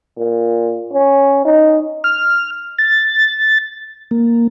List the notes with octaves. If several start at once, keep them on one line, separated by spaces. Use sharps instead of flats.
A#2
C#4
D#4
F6
A6
A#3